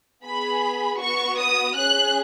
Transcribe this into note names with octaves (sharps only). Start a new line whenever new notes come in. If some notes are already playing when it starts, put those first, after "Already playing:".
B3 G#4 B5
B3 F#4 C#6
D#6
C#4 G#4 F#6